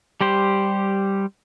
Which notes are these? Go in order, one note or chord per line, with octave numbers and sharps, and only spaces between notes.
G3 G4 C5